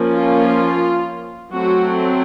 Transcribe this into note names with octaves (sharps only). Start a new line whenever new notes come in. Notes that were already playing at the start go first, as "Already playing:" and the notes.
Already playing: F3 A#3 C#4
F4
F#3 A3 C4 F#4